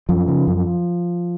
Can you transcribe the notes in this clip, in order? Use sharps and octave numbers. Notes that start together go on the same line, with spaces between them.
F#2 F3
C#3
F#2